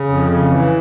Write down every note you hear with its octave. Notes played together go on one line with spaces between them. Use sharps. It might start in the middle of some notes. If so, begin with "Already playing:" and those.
Already playing: C#3
F2
C#3
E3